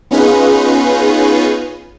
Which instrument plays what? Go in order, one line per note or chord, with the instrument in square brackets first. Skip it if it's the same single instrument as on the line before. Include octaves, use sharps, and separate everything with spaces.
[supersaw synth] B3 C#4 D#4 F4 G#4 B4